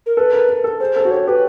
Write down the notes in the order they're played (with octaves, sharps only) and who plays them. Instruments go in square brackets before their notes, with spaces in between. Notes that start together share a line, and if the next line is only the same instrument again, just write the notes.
[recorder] A#4
[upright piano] A4 [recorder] B4
[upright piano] A#4
A#4
A4
[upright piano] G#4 [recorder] C5
[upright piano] A4
F#4
[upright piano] G4 [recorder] C#5
[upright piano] G4 [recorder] B4